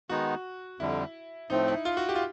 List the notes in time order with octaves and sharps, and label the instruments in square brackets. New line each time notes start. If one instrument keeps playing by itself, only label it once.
[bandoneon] D#3 G#3 B3 D#4 [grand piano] F#4
[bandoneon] F2 D3 G3 [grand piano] E4
[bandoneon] A2 F3 A3 C4 [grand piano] D#4
[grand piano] E4
F4
F#4
G4
F4